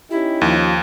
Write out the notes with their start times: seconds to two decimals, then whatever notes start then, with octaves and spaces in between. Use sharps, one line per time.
0.11 C#4 D#4 E4 G4
0.41 D#2 F3